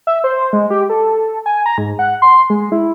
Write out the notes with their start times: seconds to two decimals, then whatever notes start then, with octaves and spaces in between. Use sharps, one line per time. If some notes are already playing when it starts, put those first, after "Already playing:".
0.07 E5
0.24 C5
0.53 G#3
0.70 G4
0.89 A4
1.46 G#5
1.66 A#5
1.78 G#2
1.99 F#5
2.22 C6
2.50 G#3
2.72 E4